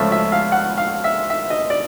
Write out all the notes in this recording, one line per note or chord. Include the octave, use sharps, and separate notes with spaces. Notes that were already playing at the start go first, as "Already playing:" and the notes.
Already playing: C#2 C#3 F3 A3 E5
E5
F5
F#5
F5
E5
E5
D#5
D5